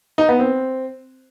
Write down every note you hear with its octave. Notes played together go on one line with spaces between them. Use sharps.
D#4
B3
C4